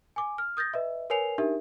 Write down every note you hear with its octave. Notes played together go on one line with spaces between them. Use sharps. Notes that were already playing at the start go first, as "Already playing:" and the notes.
G#5 D6
F6
D#6 G6 A6 A#6
B4 D#5 E5
A#4 B4 C#5 G#5 C7 F7
D4 D#4 G4 A#4 E5